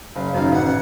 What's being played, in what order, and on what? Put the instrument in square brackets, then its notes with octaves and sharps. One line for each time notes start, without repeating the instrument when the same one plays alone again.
[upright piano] F#1 [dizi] F5
[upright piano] F#2 D#3 [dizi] F5
[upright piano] A1 [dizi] F#5